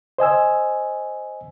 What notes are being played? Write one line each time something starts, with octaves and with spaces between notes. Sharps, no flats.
C5 D#5 G#5 E6